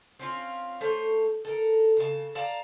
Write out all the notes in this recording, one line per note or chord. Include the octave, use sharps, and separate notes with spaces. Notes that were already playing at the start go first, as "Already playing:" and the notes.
C4 C#4 F4
A3 C5 C#5
A4 A#4
C#3 A5
D5 F5 A5 A#5